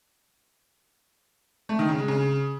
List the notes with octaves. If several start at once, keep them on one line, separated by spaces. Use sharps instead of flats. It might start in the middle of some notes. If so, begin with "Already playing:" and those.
A3
D#3
C#3
G#3
C#3